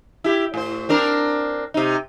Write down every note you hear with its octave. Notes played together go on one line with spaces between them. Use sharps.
E4 G4
A2 C5
C4 D4 A#4
C3 D#4